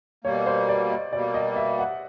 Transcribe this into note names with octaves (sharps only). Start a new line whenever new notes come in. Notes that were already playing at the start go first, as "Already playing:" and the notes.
B2 G3 A#3 C#5
C5
D5
D#5
B2 G3 A#3 D5
D#5
E5
F#5